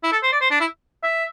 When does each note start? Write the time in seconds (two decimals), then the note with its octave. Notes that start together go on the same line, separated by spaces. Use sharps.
0.03 E4
0.12 A4
0.23 C5
0.32 D5
0.41 C5
0.51 D4
0.60 E4
1.03 E5